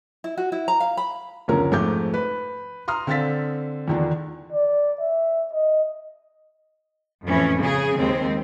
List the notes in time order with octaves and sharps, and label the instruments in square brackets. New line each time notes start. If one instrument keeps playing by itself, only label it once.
[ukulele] E4
F#4
E4
A#5
F5
B5
[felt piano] F#1 D2 F3 A#3 C#4 A#4
F2 G#2 A3 D6 G6
B4
A#5 C6 D#6 F6
D3 C4 A4 F5 A6 B6
E2 D3 D#3 F3 D4
[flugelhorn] D5
E5
D#5
[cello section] F2 A2 E3 C#4
C#3 G#4
D#2 G#3 C4